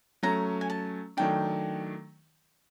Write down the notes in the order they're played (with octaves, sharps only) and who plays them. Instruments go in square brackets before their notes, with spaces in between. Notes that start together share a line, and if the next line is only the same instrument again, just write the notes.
[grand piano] F#3 A3 C#4 [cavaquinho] A#5
[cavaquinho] G#5
A5
[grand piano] D#3 F#3 A3 D4 [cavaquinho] G5